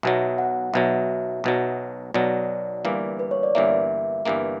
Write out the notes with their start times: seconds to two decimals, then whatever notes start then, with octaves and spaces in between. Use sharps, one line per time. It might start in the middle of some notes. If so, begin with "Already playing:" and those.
0.03 B1 B2 F#3 E5
0.38 F#5
0.74 B1 B2 F#3 E5
1.44 B1 B2 F#3
2.14 B1 B2 F#3 D5
2.85 G1 G2 E3 A#3
3.19 B4
3.31 C#5
3.43 D5
3.55 G1 G2 E3 A#3 E5
4.25 G1 G2 E3 A#3